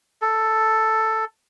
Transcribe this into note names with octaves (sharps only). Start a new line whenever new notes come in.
A4